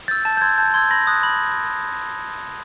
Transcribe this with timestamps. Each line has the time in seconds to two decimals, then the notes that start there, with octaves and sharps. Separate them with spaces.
0.08 E6 G6 A6
0.25 A5 A6
0.37 G6
0.41 C6 E6 G#6
0.58 A5 G6
0.74 C6 E6 G#6
0.91 B5 A#6
1.07 D#6 F#6
1.23 B5